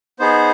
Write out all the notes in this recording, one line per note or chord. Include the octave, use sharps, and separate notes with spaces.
B3 D#4 G#4 C5